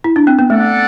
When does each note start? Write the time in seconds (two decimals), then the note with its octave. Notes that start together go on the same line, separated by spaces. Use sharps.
0.04 E4
0.16 D4
0.27 C4
0.39 B3
0.50 A3 D4 A4 D5 F#5